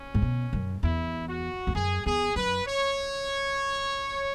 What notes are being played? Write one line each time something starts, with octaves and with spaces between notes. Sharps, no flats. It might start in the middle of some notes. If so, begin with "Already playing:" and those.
Already playing: C#4
G#2
B2
F#2
E2 E4
F#4
E2
F#2 G#4
E2 G#4
F#2 B4
C#5